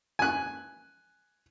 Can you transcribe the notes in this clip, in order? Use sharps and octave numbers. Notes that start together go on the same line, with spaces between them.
G#5 F#6